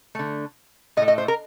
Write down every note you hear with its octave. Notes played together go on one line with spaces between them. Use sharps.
D3 A3
A2 A3 D#5
D#5
C5
A#4